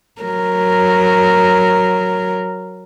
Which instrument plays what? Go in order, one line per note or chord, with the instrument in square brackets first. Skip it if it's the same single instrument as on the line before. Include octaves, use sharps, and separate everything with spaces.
[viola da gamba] F#3 A#4